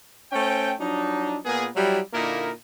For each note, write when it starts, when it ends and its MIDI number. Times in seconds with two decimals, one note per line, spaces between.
0.32 0.73 57
0.32 0.73 61
0.32 0.73 72
0.32 0.73 79
0.81 1.39 53
0.81 1.39 54
0.81 1.39 62
0.81 1.39 63
1.45 1.68 46
1.45 1.68 59
1.45 1.68 68
1.76 2.00 54
1.76 2.00 55
1.76 2.00 64
2.13 2.51 46
2.13 2.51 50
2.13 2.51 58
2.13 2.51 63
2.13 2.51 64
2.13 2.51 70